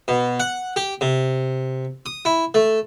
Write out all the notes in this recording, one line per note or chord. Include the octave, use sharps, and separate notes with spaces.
B2
F#5
G4
C3
D#6
E4
A3